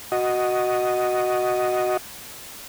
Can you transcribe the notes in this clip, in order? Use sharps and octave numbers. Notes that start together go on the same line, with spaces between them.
F#4 D#5